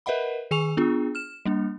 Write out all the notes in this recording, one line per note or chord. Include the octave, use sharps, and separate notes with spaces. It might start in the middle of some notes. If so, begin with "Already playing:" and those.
A#4 B4 D#5 E5 F#5 B5
D#3 G#4 G#5 C#6 F7
B3 D4 F4 G#4
F6 E7
G3 A#3 D4